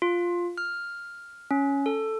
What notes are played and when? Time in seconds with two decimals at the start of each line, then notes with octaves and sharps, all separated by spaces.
0.02 F4
0.58 F6
1.51 C#4
1.86 A4